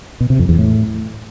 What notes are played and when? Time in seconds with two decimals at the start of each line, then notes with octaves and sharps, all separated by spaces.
0.20 B2
0.30 C3
0.39 F2
0.49 E2
0.58 A2